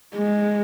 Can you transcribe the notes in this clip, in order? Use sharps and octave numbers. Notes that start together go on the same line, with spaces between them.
G#3